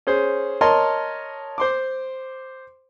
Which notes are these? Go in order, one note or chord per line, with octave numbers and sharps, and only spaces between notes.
C#4 G#4 C5
A#4 C#5 D#5 A5 C6
C5 C6 D6